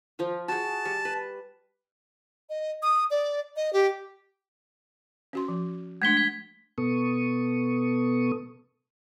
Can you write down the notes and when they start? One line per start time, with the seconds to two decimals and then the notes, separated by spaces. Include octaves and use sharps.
0.19 F3 F4
0.48 F#4 G#4 A5
0.85 G3 C#6
1.05 B4
2.49 D#5
2.82 D#6
3.11 D5
3.56 D#5
3.73 G4
5.33 C#4 F#4 C6
5.48 F3
6.02 G#3 A3 D4 G#6 B6 G7
6.17 B6
6.78 B2 B3 A4 C#6 D#6